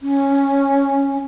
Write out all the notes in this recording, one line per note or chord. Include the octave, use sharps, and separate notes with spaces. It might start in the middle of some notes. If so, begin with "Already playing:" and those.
C#4